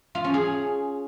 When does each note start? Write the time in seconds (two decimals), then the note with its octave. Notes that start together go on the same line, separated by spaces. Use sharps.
0.15 F4
0.24 C#4
0.34 G#4